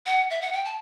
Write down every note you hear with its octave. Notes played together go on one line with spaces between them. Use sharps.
F#5
E5
F#5
G5
A5